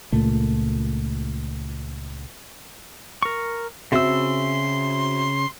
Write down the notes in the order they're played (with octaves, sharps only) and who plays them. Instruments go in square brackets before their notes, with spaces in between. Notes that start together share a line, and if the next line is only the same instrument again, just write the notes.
[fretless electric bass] C#2 A#2 A3
[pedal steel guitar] A#4 C#6
[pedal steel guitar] C#3 E6 [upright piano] C4 F#4 E5 [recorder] C6